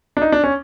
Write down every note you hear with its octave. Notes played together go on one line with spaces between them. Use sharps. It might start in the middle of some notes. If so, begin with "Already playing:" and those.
D4
D#4
D4
C#4